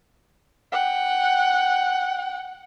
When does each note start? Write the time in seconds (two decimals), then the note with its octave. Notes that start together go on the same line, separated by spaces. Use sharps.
0.72 F#5 G5